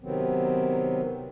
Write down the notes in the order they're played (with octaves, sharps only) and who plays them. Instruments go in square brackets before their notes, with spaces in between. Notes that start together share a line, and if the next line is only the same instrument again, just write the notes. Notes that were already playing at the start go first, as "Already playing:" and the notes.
[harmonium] C3 D#3 F#3 B3 C4